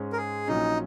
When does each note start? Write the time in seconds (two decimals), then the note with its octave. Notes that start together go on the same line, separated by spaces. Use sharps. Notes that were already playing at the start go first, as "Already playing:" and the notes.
Already playing: G#2 G#3 C#4
0.13 A#4
0.17 G#4
0.47 A#1 A#2 F#3 C#4 D#4